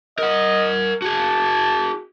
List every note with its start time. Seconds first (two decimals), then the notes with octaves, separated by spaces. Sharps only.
0.19 A#4 D#5 F#5
1.02 F#4 G#4 A5